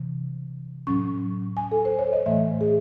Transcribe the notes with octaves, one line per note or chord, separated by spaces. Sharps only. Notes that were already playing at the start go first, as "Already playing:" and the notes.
Already playing: C3 E3
A2 F#3 C#4 C#6
G#5
A4
C5
C#5
D#5
A2 E3 A3 E5
G#4